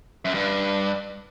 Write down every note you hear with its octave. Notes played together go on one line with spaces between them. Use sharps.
F#2
G2